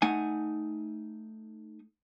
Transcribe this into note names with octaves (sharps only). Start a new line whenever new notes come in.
A3 D#4 F#5 G#5